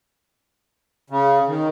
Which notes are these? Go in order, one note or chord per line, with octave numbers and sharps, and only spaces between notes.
C#3
D#3